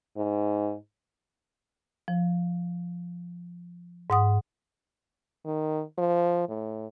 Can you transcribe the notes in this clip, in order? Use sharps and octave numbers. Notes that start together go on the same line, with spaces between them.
G#2
F3
G#2 F#5 D#6
D#3
F3
A2